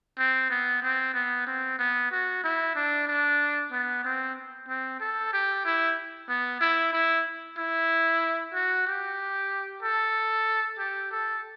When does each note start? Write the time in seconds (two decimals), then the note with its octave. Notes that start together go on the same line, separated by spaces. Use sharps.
0.18 C4
0.50 B3
0.83 C4
1.14 B3
1.47 C4
1.79 B3
2.12 F#4
2.44 E4
2.76 D4
3.07 D4
3.72 B3
4.04 C4
4.68 C4
5.00 A4
5.33 G4
5.65 E4
6.29 B3
6.61 E4
6.93 E4
7.58 E4
8.54 F#4
8.87 G4
9.83 A4
10.78 G4
11.12 A4